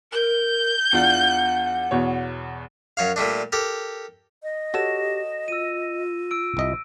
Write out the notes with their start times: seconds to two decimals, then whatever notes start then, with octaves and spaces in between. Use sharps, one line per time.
0.13 A#4 G6
0.93 E2 D4 F4 F#5
1.91 E2 B2 C#5
2.97 F#2 C#5 F5
3.16 A#2 G3 A3 D4
3.52 G4 A4 A#4
4.43 D#5
4.74 F#4 G4 A4 C#5 A#6 E7
5.48 F4 E6 D#7
6.31 E6 D7
6.57 C2 D#5 E5